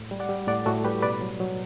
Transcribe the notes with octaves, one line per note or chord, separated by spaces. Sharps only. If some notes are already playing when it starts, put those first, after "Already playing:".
Already playing: A2
G3
D5 F#5
G3
A2 D5 F#5
A2 F#4 A4
G3 G4 B4
B2 B4 D5
F#3
F#3